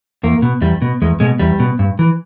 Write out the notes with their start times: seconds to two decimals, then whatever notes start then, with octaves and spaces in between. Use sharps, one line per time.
0.23 E2 A#3
0.42 B2
0.61 E2 G3
0.82 B2
1.02 E2 G#3
1.20 B2 G#3
1.39 E2 G3
1.60 B2
1.79 G2
1.99 E3